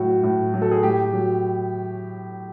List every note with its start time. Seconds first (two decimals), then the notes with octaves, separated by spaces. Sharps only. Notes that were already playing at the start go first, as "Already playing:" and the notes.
Already playing: A2 F#3 F#4
0.23 A2
0.54 F#3
0.62 A4
0.71 G#4
0.83 A2 G4
1.13 F#3